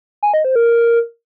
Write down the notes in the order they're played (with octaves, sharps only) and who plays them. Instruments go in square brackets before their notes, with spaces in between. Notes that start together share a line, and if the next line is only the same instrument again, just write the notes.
[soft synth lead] G#5
D#5
C5
A#4